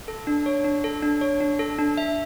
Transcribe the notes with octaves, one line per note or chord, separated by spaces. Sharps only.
A4
D4
C#5
D4
A4
D4
C#5
D4
A4
D4
E5